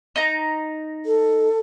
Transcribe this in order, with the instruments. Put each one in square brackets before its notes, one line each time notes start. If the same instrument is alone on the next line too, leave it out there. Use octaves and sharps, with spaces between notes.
[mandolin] D#4 A#5
[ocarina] A4